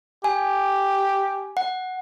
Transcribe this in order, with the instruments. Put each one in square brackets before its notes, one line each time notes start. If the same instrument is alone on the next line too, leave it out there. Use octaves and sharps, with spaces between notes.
[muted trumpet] G4 [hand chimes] G#5
[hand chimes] F#5